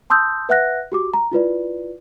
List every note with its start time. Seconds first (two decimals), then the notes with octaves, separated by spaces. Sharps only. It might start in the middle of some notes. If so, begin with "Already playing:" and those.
0.10 A5 C6 D#6 E6 G6
0.49 B4 E5 F#5 F#6 A#6
0.92 F#4 G4 D6
1.14 A#5
1.32 E4 F4 B4 D5